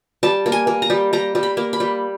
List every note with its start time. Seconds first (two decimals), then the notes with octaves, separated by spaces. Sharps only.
0.23 G3 A5
0.46 A#3
0.52 G#5
0.67 A#3
0.82 A#5
0.90 G3
1.13 G3 A#5
1.35 G3
1.43 B5
1.57 A#3
1.73 B5
1.80 G3